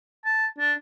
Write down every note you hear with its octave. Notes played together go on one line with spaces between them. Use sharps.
A5
D4